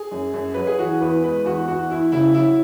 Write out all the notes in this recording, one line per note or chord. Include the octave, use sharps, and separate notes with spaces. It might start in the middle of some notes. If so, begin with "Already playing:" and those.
Already playing: G#4
F#2
F#2
F#3 B4
G#4
E3 F#4
E2 B4
G#3 B4
E2 F#4
E2 F#4
E2 E4
C#3 E4
F#3 E4